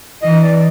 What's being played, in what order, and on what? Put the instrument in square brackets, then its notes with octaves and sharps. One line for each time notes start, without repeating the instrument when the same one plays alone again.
[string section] E3 [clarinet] D#5
[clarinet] D5